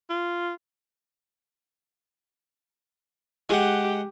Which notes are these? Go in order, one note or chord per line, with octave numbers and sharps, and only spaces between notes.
F4
G#3 G4 F#5